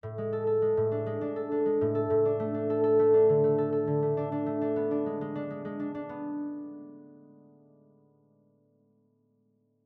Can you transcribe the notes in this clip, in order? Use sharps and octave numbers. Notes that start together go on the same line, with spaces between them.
A2
G#3
A4
A4
G#3
A2
D4
G#3
D4
A4
D4
G#3
A2
A4
A2
D4
A3
D4
A4
A4
A3
D4
D3
A3
A4
A4
D3
A3
D4
D4
A3
D4
B3
D4
G#3
G#3
D4
G#3
G#3
D4
D4
B3